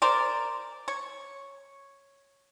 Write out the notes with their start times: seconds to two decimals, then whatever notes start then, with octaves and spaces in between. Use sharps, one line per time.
0.02 A#4 C5 D5
0.88 C#5